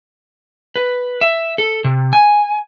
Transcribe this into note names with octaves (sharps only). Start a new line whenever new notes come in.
B4
E5
A4
C3
G#5